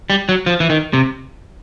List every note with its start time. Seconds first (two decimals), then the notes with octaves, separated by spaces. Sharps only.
0.10 G3
0.29 F#3
0.46 F3
0.60 E3
0.70 D#3
0.93 C3